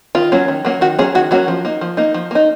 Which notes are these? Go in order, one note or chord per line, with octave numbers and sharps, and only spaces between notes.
D#3 F4
F#3 A#3 C#4
D#3
F#3 A#3 C#4
D#3 F#4
F#3 A#3 C#4 G#4
D#3 F#4
F#3 A#3 C#4 F#4
F3
A#3 D#4
F3
A#3 D#4
F3
A#3 D#4